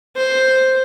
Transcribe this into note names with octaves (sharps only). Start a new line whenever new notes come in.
C5